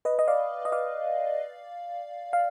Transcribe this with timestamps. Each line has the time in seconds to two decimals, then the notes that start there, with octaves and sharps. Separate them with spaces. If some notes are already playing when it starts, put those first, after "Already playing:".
0.05 B4 D#5
0.19 D#5
0.28 D5 F5
0.65 D#5
0.72 D5 F5
2.33 F5